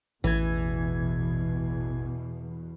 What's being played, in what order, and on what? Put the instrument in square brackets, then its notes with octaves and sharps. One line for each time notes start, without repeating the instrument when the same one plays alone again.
[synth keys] A1 G#6 [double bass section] E2 B2 [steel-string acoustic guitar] E3